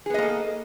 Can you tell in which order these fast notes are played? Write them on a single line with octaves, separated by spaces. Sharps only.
G#4 B3 D#5 A#3 A4